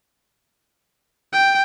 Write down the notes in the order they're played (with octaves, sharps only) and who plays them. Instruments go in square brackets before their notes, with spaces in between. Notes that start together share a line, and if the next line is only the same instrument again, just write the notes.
[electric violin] G5